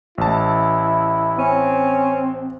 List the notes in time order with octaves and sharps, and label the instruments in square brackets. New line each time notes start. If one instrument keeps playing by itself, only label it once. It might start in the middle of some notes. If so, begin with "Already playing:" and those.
[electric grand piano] A1 A5 [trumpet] E4
[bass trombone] C4 [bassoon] C#4